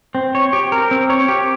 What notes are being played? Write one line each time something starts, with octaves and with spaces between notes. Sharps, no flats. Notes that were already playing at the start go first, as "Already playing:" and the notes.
C4
C#5
G4
A#4
C4
C#5
G4